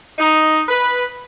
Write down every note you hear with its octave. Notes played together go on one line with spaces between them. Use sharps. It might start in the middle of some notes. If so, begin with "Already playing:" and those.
D#4
B4